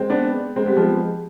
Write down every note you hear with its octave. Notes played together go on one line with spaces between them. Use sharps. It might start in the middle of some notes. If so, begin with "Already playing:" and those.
Already playing: G#3 C4
B3 D4
G#3 C4
G3 B3
F3 G#3